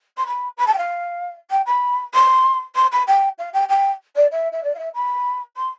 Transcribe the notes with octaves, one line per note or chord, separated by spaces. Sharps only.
C6
B5
B5
A5
G5
F5
G5
B5
C6
C6
B5
G5
F5
G5
G5
D5
E5
E5
D5
F5
E5
B5
C6